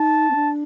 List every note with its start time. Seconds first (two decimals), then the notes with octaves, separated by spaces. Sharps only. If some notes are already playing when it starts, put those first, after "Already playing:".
Already playing: D#4 A5
0.30 C4
0.35 D4